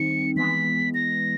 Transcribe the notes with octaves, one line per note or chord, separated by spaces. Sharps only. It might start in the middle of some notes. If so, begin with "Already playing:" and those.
Already playing: D#3 G3 C4 D#4 C#7
E3 G#3 B3 B6
A#6